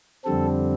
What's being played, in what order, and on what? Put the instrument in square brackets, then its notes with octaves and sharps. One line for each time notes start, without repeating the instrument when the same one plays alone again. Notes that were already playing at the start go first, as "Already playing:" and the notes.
[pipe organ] F2 D3 G3 C4 A4